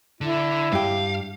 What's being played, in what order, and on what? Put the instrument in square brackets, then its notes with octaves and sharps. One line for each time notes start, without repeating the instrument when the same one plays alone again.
[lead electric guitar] D3 [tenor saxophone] E4
[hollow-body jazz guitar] G2 G4 [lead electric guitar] F5